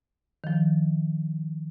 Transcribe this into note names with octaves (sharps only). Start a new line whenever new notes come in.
D#3 F3